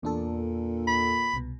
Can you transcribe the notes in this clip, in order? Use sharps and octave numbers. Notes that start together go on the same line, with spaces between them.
E2 A#2 D4 A4
B5
C2 B2